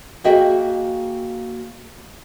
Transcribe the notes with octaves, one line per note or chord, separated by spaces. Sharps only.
A#3 F#4 G#4 D#5 E5 G5